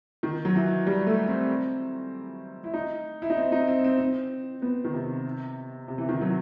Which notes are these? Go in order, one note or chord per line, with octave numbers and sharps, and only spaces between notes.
D#3
F#3
E3
G3
A3
C4
E4
D#4
E4
D#4
C4
D#4
C4
C4
C4
B3
D#3
C3
C3
E3
D#3
F#3